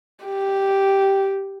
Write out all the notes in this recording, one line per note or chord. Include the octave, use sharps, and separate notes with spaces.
G4